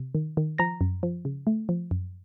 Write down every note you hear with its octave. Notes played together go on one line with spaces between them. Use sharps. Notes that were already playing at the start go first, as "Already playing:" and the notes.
Already playing: C3
D#3
D#3
F3 A#5 A#6
F#2
F3
C#3
A3
F3
F#2